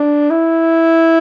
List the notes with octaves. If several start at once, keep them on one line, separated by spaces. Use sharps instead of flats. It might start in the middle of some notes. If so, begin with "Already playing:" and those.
Already playing: D4
E4